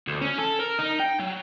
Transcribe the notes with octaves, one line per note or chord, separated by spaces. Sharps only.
D2
C#4
A4
A#4
D#4
G5
F#3